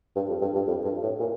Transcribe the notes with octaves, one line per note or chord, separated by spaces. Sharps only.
G2
F2
G2
G2
F2
G2
A2
A#2